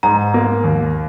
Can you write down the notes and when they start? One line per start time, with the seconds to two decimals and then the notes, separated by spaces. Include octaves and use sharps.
0.03 G#2 A#5
0.34 A#3
0.64 D#2